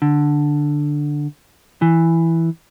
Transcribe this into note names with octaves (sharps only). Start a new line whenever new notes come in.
D3
E3